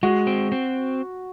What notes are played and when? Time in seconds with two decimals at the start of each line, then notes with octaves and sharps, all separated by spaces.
0.03 G#3 F#4
0.27 C4
0.52 C4